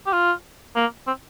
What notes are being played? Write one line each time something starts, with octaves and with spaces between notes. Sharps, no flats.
G4
F4
A#3
C4